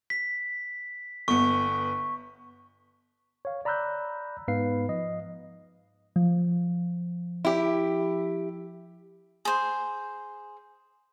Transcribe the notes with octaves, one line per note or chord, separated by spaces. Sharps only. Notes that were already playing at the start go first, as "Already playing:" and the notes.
B6
G1 B3 C#6
C#5 F5
D5 A#5 B5 E6 F#6 G6
G#2 B3 B4 F5 C7
F3 D#5
F3
E4 G4
G#4 C5